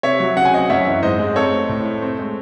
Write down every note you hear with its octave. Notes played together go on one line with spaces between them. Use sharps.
C3 C#5 E5
F#3
C#3 F#5
G#5
C4 D#5 F#5
F#2 C#5 E5
E3
G#2 C5 D#5
G#3
C4 A4 C#5
A3
A2
A3
C4
G#3